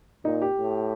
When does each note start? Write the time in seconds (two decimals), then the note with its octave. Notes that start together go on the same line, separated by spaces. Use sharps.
0.25 A#2 D#4
0.42 G4
0.58 A2